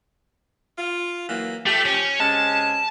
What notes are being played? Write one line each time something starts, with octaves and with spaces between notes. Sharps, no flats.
F4
E3 F#3 A#3
F3 A3 G4
C#4
C3 G#3 C#4 A5